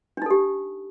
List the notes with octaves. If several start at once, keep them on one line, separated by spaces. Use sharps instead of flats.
D4 D#4 G4 A4